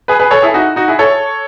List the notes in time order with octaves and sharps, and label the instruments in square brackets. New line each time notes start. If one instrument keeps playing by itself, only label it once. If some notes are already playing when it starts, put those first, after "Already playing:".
[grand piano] G#4 B4
G#4 B4
A4 C#5
E4 G#4
D#4 F#4
D#4 F#4
E4 G#4
A4 C#5